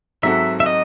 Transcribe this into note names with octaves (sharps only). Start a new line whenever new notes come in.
G#2 F#3 C4 F#4 A4 E5
E5
D#5